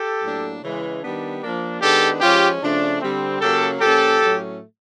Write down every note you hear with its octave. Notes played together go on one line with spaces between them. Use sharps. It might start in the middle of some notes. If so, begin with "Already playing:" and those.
Already playing: G4 A4
A2 F#3 A#3 D4
C#3 E3 G#3
D#3 G3 B3 D4
F3 A#3 D4
D#3 G#3 B3 D4 G4 A4
F3 G#3 C#4 F4 G4
C#3 F3 A3 D4
D3 G3 C4
C#3 F#3 A#3 C#4 G4 A4
A#2 F3 A#3 C#4 G4 A4
A2 F#3 A3 C#4